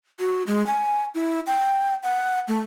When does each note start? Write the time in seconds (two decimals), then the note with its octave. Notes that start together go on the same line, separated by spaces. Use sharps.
0.20 F#4
0.47 G#3
0.67 G#5
1.14 E4
1.47 G5
2.03 F#5
2.48 A3